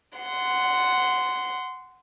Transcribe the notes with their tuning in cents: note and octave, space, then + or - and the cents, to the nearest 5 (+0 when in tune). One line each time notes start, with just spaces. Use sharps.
F#5 +0 C6 -15